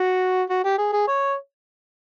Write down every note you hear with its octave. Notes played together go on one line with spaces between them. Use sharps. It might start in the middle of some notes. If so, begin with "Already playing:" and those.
Already playing: F#4
F#4
G4
G#4
G#4
C#5